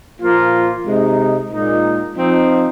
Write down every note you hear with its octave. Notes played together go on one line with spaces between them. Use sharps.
A#2 F3 A#3 F4
C3 G#3 D#4
A#2 G#3 D#4
F3 C4 D#4